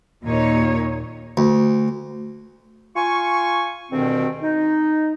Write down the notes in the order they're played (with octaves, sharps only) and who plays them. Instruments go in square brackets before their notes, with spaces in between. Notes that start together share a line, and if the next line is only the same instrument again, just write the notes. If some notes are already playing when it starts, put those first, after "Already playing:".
[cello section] D#2 A#2 D#4 C#5
[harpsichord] D2
[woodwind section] F4 G#5 C#6
D2 G2 B2 D#3 C4
D#4